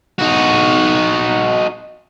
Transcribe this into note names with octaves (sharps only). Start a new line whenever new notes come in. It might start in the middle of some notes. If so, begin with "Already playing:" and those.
D#4 F#4